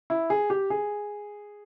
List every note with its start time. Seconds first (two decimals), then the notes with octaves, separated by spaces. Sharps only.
0.10 E4
0.30 G#4
0.50 G4
0.70 G#4